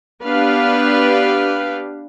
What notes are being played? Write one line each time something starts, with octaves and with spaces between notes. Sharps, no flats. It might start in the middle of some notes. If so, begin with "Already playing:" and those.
B3 D4 G4 B4 F5